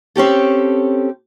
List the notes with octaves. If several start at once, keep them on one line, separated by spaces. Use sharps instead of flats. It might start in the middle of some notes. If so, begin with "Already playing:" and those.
C4 C#4 G4 A4